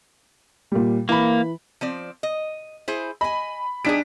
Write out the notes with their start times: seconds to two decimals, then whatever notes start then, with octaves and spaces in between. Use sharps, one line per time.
0.72 A#2 G3
1.09 E3 A#3 B5
1.81 F3 C4 D5
2.23 D#5
2.88 E4 G#4 C5
3.21 D#5 G#5 B5
3.85 G3 D4 D#4 G#4 B6 D7